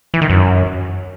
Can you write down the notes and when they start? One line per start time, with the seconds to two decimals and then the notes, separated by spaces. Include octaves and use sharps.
0.14 E3
0.22 D#3
0.30 F#2